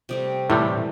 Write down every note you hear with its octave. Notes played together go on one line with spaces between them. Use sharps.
C3 G3 A3
A2 C3 E3 G3